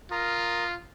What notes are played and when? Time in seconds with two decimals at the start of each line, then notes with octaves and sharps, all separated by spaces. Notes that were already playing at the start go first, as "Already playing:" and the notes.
0.11 F4 A#4 A#5 D#6